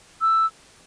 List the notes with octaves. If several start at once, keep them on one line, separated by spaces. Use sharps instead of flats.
E6